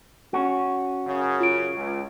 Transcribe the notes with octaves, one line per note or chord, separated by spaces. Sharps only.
C#4 F#4
F#2 C#3
F4 D7
C#2